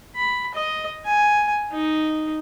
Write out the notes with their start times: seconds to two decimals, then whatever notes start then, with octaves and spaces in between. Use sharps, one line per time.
0.16 B5
0.54 D#5
1.05 G#5
1.72 D#4